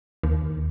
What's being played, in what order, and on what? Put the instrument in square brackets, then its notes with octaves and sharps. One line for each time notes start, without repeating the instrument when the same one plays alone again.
[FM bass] D#2